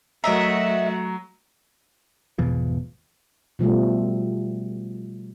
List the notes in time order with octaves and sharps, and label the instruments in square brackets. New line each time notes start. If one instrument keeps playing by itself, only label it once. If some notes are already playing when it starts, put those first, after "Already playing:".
[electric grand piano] F#3 A#5 [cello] A3 F#4 [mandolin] A#4 D#5 E5
[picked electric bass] G#1 E2 B2 F3
[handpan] B2 F3 G3 A3